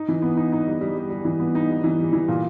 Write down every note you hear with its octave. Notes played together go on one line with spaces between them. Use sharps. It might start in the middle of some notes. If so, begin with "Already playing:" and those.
Already playing: D#4
E3
B3
D#4
D#4
G3
G3
G3
G3
E3
B3
D#4
G3
E3
G3
E3
A#2